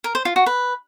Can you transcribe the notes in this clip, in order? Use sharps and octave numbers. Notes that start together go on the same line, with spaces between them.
A#4
C5
F4
F#4
B4